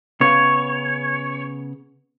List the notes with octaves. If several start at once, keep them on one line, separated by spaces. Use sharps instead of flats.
C#3 B3 C#5